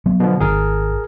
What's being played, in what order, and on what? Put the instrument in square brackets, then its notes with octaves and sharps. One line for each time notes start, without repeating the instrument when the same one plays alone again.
[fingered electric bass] F#3 B3
[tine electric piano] B2 D3 F3
[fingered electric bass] G#1 D#3 [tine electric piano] G#4 A#4